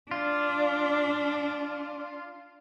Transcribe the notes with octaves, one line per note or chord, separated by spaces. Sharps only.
D4 F4